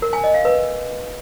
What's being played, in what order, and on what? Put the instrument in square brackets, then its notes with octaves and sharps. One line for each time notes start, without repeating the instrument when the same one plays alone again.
[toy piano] A#4
G#5
D#5
F5
B4